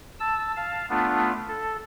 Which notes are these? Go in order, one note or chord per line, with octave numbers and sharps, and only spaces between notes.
A5 E6
F5 A5
A3 B3 D4 F4
A4